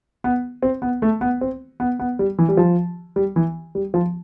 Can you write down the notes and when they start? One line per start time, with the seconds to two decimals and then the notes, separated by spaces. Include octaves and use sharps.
0.24 B3
0.62 C4
0.82 B3
1.02 A3
1.21 B3
1.41 C4
1.80 B3
1.99 B3
2.19 G3
2.38 E3
2.49 G3
2.57 F3
3.16 G3
3.36 E3
3.75 G3
3.94 F3